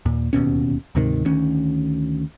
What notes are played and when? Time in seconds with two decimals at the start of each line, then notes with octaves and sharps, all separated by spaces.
0.06 D#2 A#2
0.33 D1 D#2 B2 C#4
0.95 D2 G#2 C3 D#3
1.25 D2 D#3 C#4